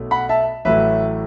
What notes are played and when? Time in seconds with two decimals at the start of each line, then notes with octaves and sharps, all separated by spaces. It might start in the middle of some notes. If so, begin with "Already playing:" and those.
Already playing: B1 B2 A3
0.11 F#5 B5
0.29 E5 A5
0.65 A1 A2 F#3 A3 B4 E5